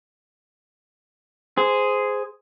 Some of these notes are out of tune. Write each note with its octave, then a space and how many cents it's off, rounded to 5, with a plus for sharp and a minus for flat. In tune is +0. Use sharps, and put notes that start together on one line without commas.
G#4 +0 C5 -15